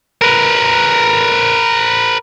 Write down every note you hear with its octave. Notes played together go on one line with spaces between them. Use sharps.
A#4 B4